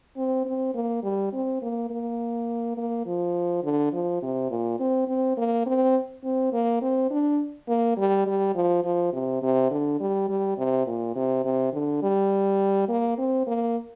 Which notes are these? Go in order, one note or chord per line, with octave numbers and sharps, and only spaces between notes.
C4
C4
A#3
G3
C4
A#3
A#3
A#3
F3
D3
F3
C3
A#2
C4
C4
A#3
C4
C4
A#3
C4
D4
A#3
G3
G3
F3
F3
C3
C3
D3
G3
G3
C3
A#2
C3
C3
D3
G3
A#3
C4
A#3